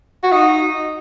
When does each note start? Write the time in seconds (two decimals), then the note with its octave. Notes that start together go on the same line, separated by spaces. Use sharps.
0.23 F#4
0.32 D#4